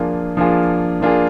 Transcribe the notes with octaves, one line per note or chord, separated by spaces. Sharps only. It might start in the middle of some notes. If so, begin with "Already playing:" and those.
Already playing: F3 A#3 D4 F4 G#4
F3 A#3 D4 F4 G#4
F3 A#3 D4 F4 G#4